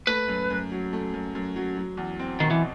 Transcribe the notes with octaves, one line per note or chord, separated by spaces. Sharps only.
A3 B4
F#2
F#2
F#3
A3
F#2
F#2
F#3
F#3
E2
C4
B2 D#3
E3